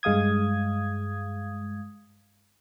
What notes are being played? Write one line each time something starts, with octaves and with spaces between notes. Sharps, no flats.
G2 G#3 F5 D#6 G#6